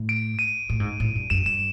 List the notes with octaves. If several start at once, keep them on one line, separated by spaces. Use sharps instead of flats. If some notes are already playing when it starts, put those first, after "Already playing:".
Already playing: A2
D7
D#7
A2
G#2
A2
G2
F#2 E7
G2 E7